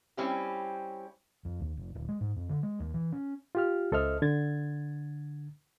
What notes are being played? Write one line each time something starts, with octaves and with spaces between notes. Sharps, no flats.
G3 C4 C#4 E4 G4
F2
D#2
F1
D1
G#3
G#2
F2
D3
G#3
D#2
E3
C#4
F4 G4 F6
C#2 A4 C5 D#5 E5 F6
D3 G#6 A6